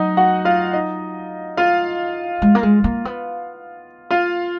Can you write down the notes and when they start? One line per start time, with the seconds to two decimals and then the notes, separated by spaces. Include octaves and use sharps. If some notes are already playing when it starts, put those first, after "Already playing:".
Already playing: F#3 D#4 D#5 F#5
0.17 F#4 F#5
0.45 F4 F5
0.73 D#4 D#5
1.57 F4 F5
2.42 G#3
2.55 A#3
2.63 G#3
2.84 A#3
3.05 B3
4.11 F4 F5